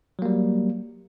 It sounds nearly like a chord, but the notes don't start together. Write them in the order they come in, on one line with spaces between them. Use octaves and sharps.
F#3 A#3 G3